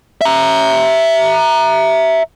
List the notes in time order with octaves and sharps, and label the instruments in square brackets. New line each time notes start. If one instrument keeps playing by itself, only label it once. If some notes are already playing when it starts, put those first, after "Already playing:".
[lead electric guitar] E5 A#5